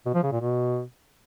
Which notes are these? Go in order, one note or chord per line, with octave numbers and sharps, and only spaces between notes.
B2
F3
C#3
A#2
B2